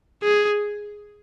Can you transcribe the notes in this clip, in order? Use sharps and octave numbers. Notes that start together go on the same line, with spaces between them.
G#4